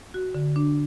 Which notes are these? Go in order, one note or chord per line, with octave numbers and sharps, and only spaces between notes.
F#4
D3
D4